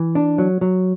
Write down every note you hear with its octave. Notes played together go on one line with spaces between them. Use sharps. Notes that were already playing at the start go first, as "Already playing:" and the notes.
Already playing: E3
D4
F#3
F#3